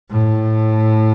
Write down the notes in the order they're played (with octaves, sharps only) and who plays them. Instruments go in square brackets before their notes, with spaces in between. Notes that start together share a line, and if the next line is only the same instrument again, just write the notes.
[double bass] A2